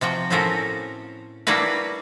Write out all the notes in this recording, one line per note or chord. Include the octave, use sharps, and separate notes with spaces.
C3 F3 F#4 G5
A2 C4 C#4 F#4 A4 A#4
G3 A#3 D4 E4 F#4 B4